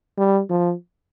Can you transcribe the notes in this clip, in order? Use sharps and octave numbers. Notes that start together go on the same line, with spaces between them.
G3
F3